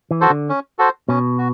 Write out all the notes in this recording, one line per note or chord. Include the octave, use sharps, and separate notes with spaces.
E3
F#4 A4 C5
D3
C#4
F#4 A4 C5
B2 C#4
F#4